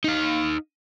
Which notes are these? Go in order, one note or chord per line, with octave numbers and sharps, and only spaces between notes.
D#4 F5